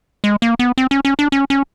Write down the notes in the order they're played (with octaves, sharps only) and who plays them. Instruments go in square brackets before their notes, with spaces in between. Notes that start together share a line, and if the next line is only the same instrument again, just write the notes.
[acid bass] G#3
A#3
B3
C4
C#4
C#4
D4
C#4
C#4